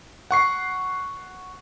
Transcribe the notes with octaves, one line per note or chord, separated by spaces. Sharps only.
F#5 C#6 C7